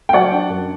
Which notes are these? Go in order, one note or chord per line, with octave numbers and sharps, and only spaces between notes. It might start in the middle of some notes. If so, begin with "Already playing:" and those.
G5
F#3 D5 F#5
D4
F#2